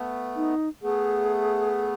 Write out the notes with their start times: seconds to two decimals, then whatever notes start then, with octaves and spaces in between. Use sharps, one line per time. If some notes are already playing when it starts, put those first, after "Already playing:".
Already playing: A3 B3
0.36 D#4
0.82 A3 B3 G#4